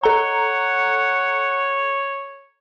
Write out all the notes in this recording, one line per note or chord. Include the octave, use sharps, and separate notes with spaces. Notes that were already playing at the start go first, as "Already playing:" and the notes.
A4 C#5 F#5 A#5